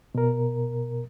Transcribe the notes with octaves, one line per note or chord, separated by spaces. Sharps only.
B2 A#4